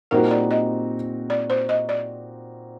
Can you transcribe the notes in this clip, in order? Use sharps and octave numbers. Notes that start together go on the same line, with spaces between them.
A#2 G3 C4 D#4 F#4 A#4
D5
D#5
D5
C5
D#5
D5